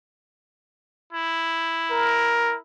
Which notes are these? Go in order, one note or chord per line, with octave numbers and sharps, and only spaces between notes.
E4
A#4